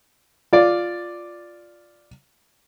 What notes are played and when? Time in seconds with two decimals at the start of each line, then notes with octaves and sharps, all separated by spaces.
0.53 F4 D5